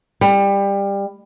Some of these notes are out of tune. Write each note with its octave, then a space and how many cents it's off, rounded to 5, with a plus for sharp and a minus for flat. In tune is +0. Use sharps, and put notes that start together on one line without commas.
G3 +20